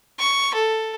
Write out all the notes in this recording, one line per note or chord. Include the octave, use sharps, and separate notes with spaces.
C#6
A4